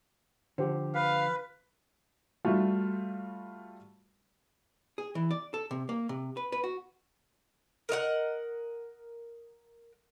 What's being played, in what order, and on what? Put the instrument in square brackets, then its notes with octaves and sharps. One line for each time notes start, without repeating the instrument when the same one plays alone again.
[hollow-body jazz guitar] D3 F3 [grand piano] G4 C5
[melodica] B4 [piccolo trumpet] F5
[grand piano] G3 A3 F4 F#4
[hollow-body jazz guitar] G#4
E3
D5
A4
C3
A#3
C3
B4
B4
F#4
[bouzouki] A#4 D#5 F5 F#5